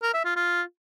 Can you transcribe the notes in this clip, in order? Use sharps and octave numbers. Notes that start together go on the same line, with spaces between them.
A#4
E5
F4
F4